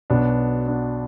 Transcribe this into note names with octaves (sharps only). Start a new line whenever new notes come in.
B1 B2 B3 D4
B3 D4